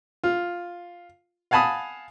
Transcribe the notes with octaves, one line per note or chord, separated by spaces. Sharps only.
F4
F5 F#5 G#5 A5 B5 D#6